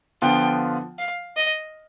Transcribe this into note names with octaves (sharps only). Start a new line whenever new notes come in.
D3 F3 B3 F4 G5
F5
D#5